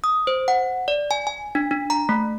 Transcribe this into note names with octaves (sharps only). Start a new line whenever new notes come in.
D#6
C5
F#5
D5
G#5
G#5
D4
D4
A#5
A3